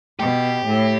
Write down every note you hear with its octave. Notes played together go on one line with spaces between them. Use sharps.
B2 G4
A2